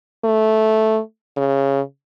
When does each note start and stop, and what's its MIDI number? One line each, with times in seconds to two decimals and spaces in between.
0.25 1.00 57
1.37 1.80 49